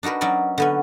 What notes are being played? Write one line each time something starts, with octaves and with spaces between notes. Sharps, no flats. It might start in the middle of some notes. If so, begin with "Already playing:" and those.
D4 D#4 F#4 A#4 B4
F#3 C#4 D#4 D5
D3 B3 C#4